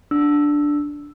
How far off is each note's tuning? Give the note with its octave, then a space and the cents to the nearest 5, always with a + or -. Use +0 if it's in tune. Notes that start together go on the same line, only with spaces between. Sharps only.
D4 +0 E6 +0